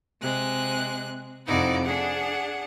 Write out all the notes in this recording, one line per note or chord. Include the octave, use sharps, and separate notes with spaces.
C3 G#3 F#6
F2 C3 D#4 E4 D5 F#5
D4 G#4 F#5